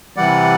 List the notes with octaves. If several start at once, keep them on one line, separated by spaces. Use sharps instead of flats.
C3 E3 G3 D5 F#5